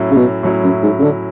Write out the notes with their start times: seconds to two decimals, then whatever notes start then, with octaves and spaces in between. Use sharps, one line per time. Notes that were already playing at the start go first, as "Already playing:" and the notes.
Already playing: A2 F#3 C#4 E4
0.11 C#3
0.17 B2
0.43 A2 F#3 C#4 E4
0.63 F#2
0.83 G#2
0.99 C#3
1.03 D3